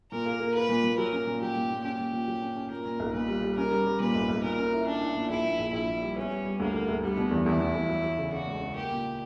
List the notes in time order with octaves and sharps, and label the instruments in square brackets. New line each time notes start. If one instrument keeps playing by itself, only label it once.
[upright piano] A#2 [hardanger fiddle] A#4
[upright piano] A#3
A#3
[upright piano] A#3 [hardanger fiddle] B4
[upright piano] A#2
A#2
[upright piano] F#3 [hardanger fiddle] A#4
[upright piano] C#4
A#2
[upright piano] F#3 [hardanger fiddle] G4
[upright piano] A#2
A#2
[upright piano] C#4 [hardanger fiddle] G4
[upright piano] A#2
A#2
F#3
C#4
C#4
[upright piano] A#2 [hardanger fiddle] A#4
[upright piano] A#2
B1
[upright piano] A#2 [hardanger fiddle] B4
[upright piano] G3
G3
[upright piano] C#4 [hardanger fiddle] A#4
[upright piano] G3
G3
[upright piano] A#2 [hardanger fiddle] B4
[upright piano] B1
B1
[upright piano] A#2 [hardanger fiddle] A#4
[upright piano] C#4
E4
[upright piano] C#4 [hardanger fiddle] D4
[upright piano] E4
A#2
[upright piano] A#1 [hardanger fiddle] E4
[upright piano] A#2
A#1
[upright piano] A#1 [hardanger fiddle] E4
[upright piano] A#2
G3
[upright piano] B3 [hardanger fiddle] C#4
[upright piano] G3
G3
[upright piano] D2 [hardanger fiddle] A#3
[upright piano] D3
D2
[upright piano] G3 [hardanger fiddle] B3
[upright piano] B2
E2
[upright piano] E2 [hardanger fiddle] E4
[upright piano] E2
E2
F#3
F#3
C#3
[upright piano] C#3 [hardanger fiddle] F#4
[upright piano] C#2
C#3
[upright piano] A#3 [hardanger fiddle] G4
[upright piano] A#2